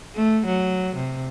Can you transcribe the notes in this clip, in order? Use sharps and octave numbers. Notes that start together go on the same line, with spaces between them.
A3
F#3
C3